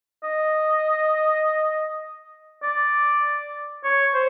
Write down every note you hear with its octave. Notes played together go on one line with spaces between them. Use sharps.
D#5
D5
C#5
C5